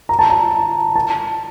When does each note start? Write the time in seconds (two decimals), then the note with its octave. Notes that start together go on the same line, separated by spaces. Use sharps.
0.09 A#5
0.19 A5
0.30 A#5
0.95 A5